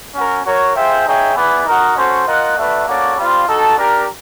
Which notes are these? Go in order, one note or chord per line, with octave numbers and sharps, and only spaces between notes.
C#4 F#4 A#4
F#4 A#4 C#5
F4 G#4 C5 E5 G5
D#4 G#4 C#5 E5 G5
B3 E4 G#4 B4 D5
D#4 F#4 A#4 D#5 F#5
C#4 F#4 A4 C5
F4 A#4 D#5 F#5
A3 D4 F#4 B4 E5
A#3 C#4 F#4 A4 D5
G3 C4 F4
D#4 F#4 A4
D4 G4 A#4